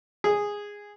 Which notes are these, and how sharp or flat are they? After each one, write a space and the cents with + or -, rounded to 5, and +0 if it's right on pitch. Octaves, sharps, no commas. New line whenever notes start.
G#4 -10